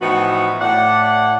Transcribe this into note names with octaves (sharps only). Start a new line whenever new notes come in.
A2 E3 F3 B3 D#4 F#4
A2 D5 F#5